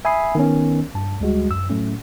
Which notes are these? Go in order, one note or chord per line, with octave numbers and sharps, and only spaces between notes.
E5 G#5 B5 D#6 C7
D#3 B3 C#4
G2 A5
D2 G3 G#3 F#4
F#2 E6
A2 F#3 A3 C#4